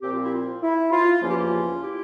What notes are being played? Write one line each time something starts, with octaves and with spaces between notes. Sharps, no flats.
A#2 F3 C4 G4
F4
E4
F4
E4
F4
E2 C#3 F3 A#3 C#4 F4
G4
F4
E4 G4